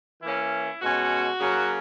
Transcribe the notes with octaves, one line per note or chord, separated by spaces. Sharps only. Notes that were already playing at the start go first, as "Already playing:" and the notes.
E3 A#3 C#4 E4
B2 G#3 C#4 F#4
C#3 F#3 A#3 C#4